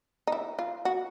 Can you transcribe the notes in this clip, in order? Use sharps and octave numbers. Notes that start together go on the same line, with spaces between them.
D#4
E4
F4
F#4